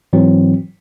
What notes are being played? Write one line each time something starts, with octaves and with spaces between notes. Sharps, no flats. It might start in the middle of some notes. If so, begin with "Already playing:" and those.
G#2 E3 F#3 C4